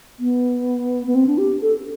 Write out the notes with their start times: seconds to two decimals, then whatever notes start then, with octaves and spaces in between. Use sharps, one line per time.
0.20 B3
1.07 B3
1.15 C4
1.27 D4
1.38 G4
1.62 A4